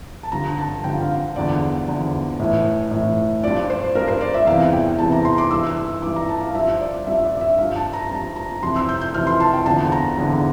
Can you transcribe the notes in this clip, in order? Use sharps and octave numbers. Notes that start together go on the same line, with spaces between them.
A5
G2 D3 F3 A#5
A5
G2 D3 F3 G5
F5
E2 D3 F3 D5
E2 D3 F3
A2 E3
A2 E3
G2 F3 D5
C5
G2 F3 A#4
C5
D5
E5
E2 C3 E3 F5
G5
E2 C3 E3 A5
A#5
C6
D6
G2 E3 E6
E6
G2 E3 D6
A#5
A5
F5
G2 F3 E5
D5
G2 F3 E5
D5
E5
G2 F3 F5
A5
A#5
G2 F3 A5
A#5
F2 C3 E3 C6
E6
G6
G6
F2 C3 E3 F6
C6
A5
G5
E2 D3 F3 A5
A#5
E2 D3 F3